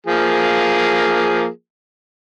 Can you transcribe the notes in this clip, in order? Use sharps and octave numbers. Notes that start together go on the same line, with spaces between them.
F3 A#3 G#4